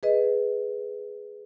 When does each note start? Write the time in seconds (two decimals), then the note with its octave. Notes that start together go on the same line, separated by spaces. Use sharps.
0.03 G#4 B4 D#5